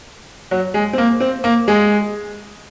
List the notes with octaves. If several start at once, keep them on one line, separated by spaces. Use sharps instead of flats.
F#3
G#3
C4
A#3
C4
A#3
G#3